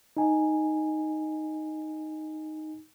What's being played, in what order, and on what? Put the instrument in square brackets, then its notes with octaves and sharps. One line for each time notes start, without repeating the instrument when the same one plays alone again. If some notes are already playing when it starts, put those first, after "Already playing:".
[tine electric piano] D#4 G#5